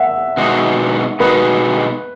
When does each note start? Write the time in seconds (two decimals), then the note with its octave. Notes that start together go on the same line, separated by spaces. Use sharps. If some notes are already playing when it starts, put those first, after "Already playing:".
Already playing: E5 F#5
0.37 B2 G#3 D#4 F#4
1.20 B2 G#3 D#4 F#4 B4